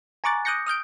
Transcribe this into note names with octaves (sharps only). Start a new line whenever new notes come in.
G#5 A#5 C#6 D6 F#6 A6
D6 D#6 F#6 G6 A#6 C#7
D#6 F6 G6 D7